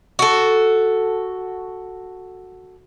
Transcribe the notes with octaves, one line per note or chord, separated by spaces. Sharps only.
F#4 A4